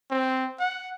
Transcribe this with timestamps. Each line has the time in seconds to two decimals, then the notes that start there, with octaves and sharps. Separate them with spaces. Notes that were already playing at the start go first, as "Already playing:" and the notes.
0.11 C4
0.60 F#5